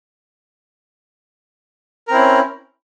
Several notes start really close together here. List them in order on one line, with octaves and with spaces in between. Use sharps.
A#4 C4 E4 C#4